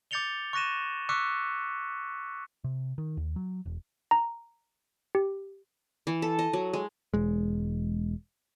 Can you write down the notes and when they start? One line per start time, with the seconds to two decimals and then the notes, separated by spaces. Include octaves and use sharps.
0.11 D6 G6 A6 C#7 F7 G7
0.53 C#6 F#6 A#6 D#7 E7
1.09 C#6 D6 E6 F#6 B6 C#7
2.64 C3
2.98 D#3
3.17 D#2
3.36 F#3
3.66 E1
4.11 A#5
5.15 G4
6.07 E3
6.22 A4
6.39 D#5
6.53 F#3
6.73 G#3
7.14 E1 G#3